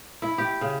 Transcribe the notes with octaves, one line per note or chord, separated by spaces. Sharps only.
E4
G4
C#3